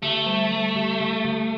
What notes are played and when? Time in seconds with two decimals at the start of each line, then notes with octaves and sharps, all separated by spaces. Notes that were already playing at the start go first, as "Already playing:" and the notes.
0.03 D3 A3
0.26 G3
0.52 G3
0.76 D3
1.00 D3
1.25 D3